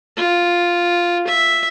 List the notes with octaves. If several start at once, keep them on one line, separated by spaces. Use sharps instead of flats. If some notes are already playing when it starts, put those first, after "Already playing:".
F4
E5